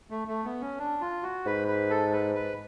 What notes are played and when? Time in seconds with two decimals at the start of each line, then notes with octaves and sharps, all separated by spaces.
0.10 A3
0.28 A3
0.44 B3
0.61 C#4
0.79 D4
1.01 F4
1.23 F#4
1.45 G#2 B4
1.68 B4
1.90 A4
2.13 B4
2.35 B4